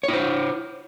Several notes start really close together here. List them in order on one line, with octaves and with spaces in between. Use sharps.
C#5 E4 C5